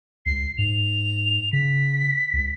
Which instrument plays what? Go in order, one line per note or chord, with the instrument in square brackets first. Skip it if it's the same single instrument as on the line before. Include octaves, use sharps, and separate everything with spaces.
[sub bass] C#2 [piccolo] C7
[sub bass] G#2 [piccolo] F7
[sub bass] C#3 [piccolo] B6
[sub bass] C#2